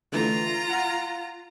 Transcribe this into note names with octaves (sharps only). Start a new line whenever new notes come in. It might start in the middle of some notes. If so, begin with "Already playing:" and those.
D3 E3 A3 F4 A#5
F5 F#5